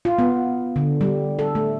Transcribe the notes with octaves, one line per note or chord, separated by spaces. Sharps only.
F4
B3
D3
G3
A4
A3